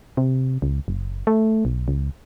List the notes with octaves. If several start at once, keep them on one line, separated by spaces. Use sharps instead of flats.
C3
C#2
F#1
A3
B1
C#2